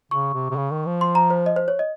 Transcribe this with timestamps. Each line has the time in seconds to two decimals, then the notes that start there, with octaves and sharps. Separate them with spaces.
0.11 C#3 C#6
0.34 C3
0.50 C3
0.56 C#3
0.71 D#3
0.86 F3
1.01 C6
1.15 A#5
1.30 C5
1.46 D#5
1.56 C5
1.68 C#5
1.79 D#5